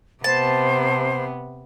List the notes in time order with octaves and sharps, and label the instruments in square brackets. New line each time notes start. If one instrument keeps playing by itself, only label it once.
[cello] C3 B3 [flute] C5 [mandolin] A5